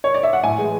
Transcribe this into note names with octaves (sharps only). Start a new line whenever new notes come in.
C#5
D5
E5
F#5
A2 G#5
E3 G#3